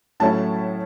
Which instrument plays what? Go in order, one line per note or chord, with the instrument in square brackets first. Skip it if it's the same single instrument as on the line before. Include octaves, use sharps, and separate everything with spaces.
[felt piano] A2 F#3 A3 C#4 E4 A5